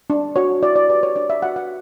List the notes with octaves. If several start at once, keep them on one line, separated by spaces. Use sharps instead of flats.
D4
F#4 C#5
E4 D5
D5
G4 B4 D5
C#5
D4 D5
E5
F#4 B4 F#5
F#5